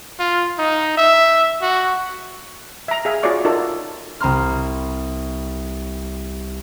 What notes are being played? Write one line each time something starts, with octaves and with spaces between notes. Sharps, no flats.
F4
D#4
E5
F#4
E5 A#5
G#4 E5 F5 G#5
F4 F#4 G#4 C#5 D5 C#6
D#4 F4 F#4 A4 A#4 D5
C2 A#5 C6 F6